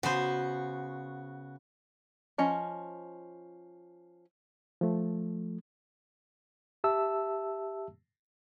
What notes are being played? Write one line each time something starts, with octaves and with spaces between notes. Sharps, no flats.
C#3 B3 F#4 C5
F3 C#4 D#5
F3 A3
G4 E5 A5 E6